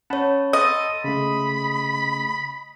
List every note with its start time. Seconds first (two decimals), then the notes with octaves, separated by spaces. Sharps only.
0.10 C#4 C#5 F#5 A5 B5
0.53 A4 D#5 C6
1.04 C#3 A3 B5